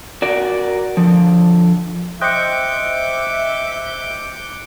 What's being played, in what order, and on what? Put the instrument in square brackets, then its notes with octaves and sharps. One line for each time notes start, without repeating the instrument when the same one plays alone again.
[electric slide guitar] F#4 A#4 D5
D3 F3
[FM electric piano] C5 D#5 G5 [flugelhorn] E5 [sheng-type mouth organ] D6 G6 [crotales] F#6 C#7